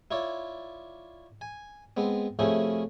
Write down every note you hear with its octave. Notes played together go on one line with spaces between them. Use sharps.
E4 F4 C#5 D5
G#5
G#3 B3 C4
C3 F3 A3 C#4 E4 G#4